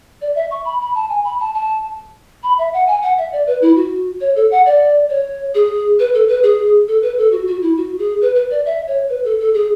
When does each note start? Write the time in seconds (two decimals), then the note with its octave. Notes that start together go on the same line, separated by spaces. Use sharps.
0.22 D5
0.35 E5
0.51 C#6
0.65 B5
0.81 B5
0.95 A5
1.09 G#5
1.25 B5
1.40 A5
1.54 A5
2.43 B5
2.59 E5
2.74 F#5
2.88 G#5
3.02 F#5
3.18 E5
3.32 D5
3.47 B4
3.62 E4
3.76 F#4
4.21 C#5
4.36 A4
4.51 F#5
4.66 D5
5.10 C#5
5.55 G#4
5.99 B4
6.14 A4
6.28 B4
6.43 G#4
6.88 A4
7.02 B4
7.18 A4
7.32 F#4
7.47 F#4
7.62 E4
7.77 F#4
7.99 G#4
8.22 B4
8.35 B4
8.51 D5
8.66 E5
8.87 C#5
9.09 B4
9.25 A4
9.40 A4
9.54 G#4